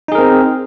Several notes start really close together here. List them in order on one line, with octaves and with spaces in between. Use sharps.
D#4 G#4 A#4 C4